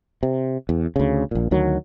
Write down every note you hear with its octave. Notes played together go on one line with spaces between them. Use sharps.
C3
E2
D2 C#3
A#1 A#2
D2 D#3 F#3